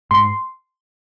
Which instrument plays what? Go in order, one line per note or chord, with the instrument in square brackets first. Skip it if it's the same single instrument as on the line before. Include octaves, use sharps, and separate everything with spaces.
[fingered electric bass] G#2 [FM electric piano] C6